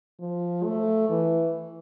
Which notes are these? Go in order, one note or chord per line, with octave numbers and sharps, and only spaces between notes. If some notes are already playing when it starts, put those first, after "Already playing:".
F3
A3
E3